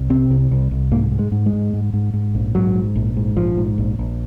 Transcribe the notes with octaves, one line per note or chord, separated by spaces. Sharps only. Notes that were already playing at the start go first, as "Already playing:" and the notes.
Already playing: C2
C3 C4
C2
C2
C2
G#2 A#3
G#2
G#3
G#2
G#3
G#2
G#2
G#2
G#2
A#1
G#2 F#3
G#2
A#1
G#2
A#1 F3
G#2
A#1
A#1